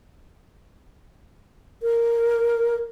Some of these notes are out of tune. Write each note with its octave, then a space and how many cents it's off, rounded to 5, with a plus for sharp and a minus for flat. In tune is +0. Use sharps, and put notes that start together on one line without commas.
A#4 +0